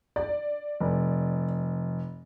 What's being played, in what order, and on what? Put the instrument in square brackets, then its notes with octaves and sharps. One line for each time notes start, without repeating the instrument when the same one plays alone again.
[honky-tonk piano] D5
[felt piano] F1